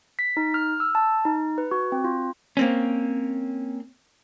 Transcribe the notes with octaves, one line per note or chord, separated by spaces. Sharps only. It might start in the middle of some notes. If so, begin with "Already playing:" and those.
B6
D#4
F6
E6
A5
D#4
B4
F#4
C4
F4
A#3 C4 C#4